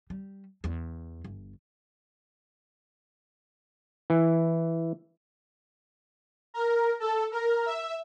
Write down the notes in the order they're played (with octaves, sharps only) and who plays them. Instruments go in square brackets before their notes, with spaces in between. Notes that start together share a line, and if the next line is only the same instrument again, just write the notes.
[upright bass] G3
E2
G1
[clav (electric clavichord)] E3
[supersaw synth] A#4
A4
A#4
E5